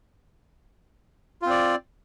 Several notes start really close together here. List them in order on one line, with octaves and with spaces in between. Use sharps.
F4 C4 D5